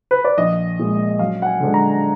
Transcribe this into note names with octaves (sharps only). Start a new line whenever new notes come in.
B4
D5
A#1 D#5
A#2 G#3
F#2 F5
F#5
G#5
D3 G#3 D4
A#5